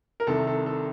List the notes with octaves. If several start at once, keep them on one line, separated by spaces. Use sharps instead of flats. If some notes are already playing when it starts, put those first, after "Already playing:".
A#4
C2 C3 D#3 A4
A4
A4